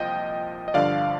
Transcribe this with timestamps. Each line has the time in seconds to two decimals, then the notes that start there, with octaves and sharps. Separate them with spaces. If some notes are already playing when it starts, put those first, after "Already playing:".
Already playing: C2 A#2 F3 D#5 G5
0.68 D#5
0.74 G2 D3 F3 D5 F5